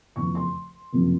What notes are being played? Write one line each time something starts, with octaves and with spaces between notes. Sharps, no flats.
F1 E2 C#3 F3 C#6
C6
F#1 F2 C3 F3